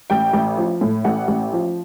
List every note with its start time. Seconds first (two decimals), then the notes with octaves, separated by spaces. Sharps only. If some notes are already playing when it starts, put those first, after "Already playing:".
0.10 A1 G5
0.33 A1
0.58 F3
0.81 A2
1.04 A1 F#5
1.28 A1
1.53 F3